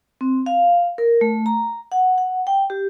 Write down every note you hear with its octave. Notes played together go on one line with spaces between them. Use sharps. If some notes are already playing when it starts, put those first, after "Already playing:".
C4
F5
A#4
A3
A#5
F#5
F#5
G5
G4